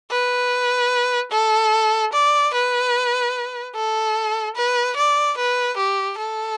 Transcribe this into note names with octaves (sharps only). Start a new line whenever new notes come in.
B4
A4
D5
B4
A4
B4
D5
B4
G4
A4